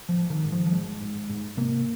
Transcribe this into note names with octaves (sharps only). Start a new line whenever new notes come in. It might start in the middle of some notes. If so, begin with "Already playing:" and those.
F3
G#1
D#3
G#2
F3
F3
G#1 G#3
G#2
G#2
C3 A#3